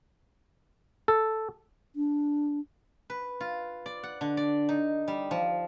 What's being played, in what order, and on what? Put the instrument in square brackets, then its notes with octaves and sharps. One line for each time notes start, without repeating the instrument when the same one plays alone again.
[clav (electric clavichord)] A4
[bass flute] D4
[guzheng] B4
F4
D5
F#5
D3
D5
D#4
G3
F3